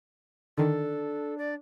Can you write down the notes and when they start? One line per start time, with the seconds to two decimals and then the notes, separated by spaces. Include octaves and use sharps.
0.58 D3 D#3 D4 A4
1.38 D5